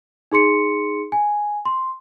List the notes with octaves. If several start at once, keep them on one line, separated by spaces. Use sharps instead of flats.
D#4 G#4 C6 C#7
G#5
C6